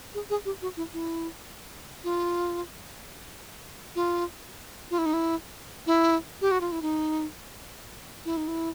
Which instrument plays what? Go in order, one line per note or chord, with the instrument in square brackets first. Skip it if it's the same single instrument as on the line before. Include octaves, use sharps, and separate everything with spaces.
[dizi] G#4
G#4
G4
F#4
E4
E4
F4
F4
F4
E4
D#4
E4
E4
G4
F#4
F4
E4
D#4
E4
D#4
E4